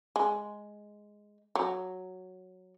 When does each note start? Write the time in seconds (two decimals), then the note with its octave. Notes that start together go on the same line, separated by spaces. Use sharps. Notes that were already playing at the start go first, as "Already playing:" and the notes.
0.16 G#3
1.55 F#3